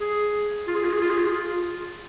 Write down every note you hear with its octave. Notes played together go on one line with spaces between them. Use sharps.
G#4
F4
G#4
F4
G#4
F4
G#4
F4
G#4
F4